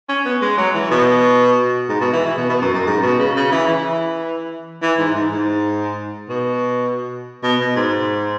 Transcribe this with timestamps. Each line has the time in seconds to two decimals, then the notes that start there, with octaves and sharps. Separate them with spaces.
0.09 C#4
0.25 B3
0.42 G#3
0.58 F#3
0.74 E3
0.90 B2
1.89 G#2
2.01 B2
2.13 E3
2.25 E3
2.37 B2
2.49 B2
2.61 F#2
2.74 F#2
2.87 G#2
3.03 B2
3.19 C#3
3.36 C#3
3.52 E3
3.68 E3
4.82 E3
4.99 G#2
5.15 G#2
5.31 G#2
6.29 B2
7.43 B2
7.60 B2
7.76 G#2